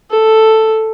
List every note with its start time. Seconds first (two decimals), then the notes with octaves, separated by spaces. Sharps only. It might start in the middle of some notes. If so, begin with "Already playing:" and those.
0.10 A4